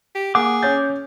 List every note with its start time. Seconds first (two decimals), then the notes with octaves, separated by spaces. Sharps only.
0.15 G4
0.35 A#3 G#4 F#5 D6
0.63 C#4 C#5 G6 A6